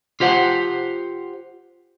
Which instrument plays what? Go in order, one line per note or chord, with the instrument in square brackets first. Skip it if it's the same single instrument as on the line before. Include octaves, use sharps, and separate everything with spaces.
[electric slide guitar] F4 G4 C5 F#5